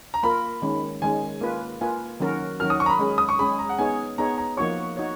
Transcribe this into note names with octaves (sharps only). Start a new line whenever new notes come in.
A#5
A#3 F4 A#4 B5
D#3 G#3 C#4
D#3 G#3 C#4 G#5
A#3 F4 B4
A#3 F4 B4 G#5
D#3 F#3 C#4 F#4 A#4
D#3 F#3 C#4 F#4 A#4 F6
D#6
C#6
A#5
B5
G#3 C#4 G#4
D#6
C#6
G#3 C#4 G#4 B5
A#5
F#5
B3 D#4 G#4 C#5 G#5
B3 D#4 G#4 C#5 A#5
A#5
F3 A#3 D#4 F#4 C#5 C#6
D#4 F#4 C#5